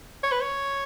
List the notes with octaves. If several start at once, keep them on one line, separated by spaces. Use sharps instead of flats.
C#5
B4
C#5